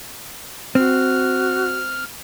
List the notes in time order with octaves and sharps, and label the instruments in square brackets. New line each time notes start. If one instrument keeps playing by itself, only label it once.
[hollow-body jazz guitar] C4 [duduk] F#4 [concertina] F6